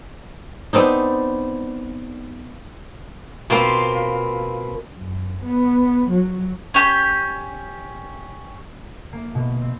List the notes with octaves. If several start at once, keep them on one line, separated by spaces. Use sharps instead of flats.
B3 C4 D4 D#4
B2 A#3 C4 F4
F#2
B3
F#3
C#4 G4
A#3
B2
C4